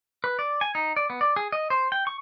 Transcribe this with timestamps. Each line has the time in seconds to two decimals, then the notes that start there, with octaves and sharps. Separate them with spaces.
0.24 B4
0.39 D5
0.61 G#5
0.75 D#4
0.96 D5
1.10 B3
1.21 D5
1.36 G#4
1.52 D#5
1.70 C5
1.92 G5
2.07 C#6